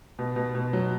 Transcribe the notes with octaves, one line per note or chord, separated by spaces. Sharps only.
B2
B2
B2
F#3